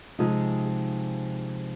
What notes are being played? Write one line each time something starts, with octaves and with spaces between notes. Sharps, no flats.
C3 F3 G#3 D#4 G#4